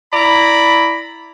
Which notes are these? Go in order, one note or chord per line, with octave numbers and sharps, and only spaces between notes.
E4 D5 A#5 B5